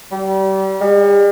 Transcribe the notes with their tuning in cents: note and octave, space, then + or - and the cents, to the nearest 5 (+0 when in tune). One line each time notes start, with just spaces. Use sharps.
G3 -30
G3 +45